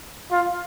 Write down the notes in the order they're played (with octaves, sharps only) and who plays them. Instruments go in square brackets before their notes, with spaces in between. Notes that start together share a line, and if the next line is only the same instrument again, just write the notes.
[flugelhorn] F4